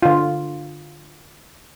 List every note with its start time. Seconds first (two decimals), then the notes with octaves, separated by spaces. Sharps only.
0.02 D3 F4